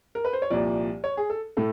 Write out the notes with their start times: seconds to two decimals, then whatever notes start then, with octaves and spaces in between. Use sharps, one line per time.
0.15 A#4
0.25 B4
0.33 C5
0.42 C#5
0.50 C2 A#2 F3 D5
1.04 C#5
1.17 G#4
1.30 A4
1.57 A2 A4